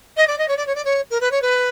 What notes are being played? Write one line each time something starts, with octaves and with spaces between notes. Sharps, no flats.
D#5
D5
D#5
C#5
D5
C#5
D5
C#5
A#4
B4
C#5
B4